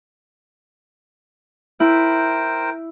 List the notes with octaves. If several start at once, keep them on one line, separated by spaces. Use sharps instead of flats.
E4 A#4 C5 G5